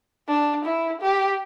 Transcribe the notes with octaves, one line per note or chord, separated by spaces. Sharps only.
D4
E4
G4